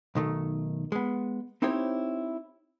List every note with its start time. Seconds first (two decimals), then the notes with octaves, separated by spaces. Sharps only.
0.15 B1 D#3 A3
0.92 G#3 B3
1.62 C4 D#4 E4 G4 C5 C#5